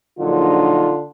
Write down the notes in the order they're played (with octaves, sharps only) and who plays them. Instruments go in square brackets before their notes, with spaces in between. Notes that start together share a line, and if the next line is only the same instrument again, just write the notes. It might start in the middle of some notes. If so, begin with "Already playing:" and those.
[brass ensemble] A#1 F#3 D#4 [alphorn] D3 [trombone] F4